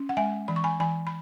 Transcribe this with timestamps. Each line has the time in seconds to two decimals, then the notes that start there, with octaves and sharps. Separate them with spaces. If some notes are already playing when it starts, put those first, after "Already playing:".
Already playing: C#4
0.09 F#5
0.17 G#3 E5 G#5
0.48 E3 B5
0.56 C#6
0.64 G#5 B5
0.80 E3 G#5 B5
1.07 B5